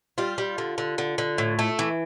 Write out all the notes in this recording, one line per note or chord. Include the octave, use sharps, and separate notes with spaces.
G3 F4
G3
D3
D3
D3
D3
A2
A3
E3